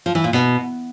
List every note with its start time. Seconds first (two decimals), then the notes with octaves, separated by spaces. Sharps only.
0.06 F3
0.15 E3
0.24 A#2
0.33 B2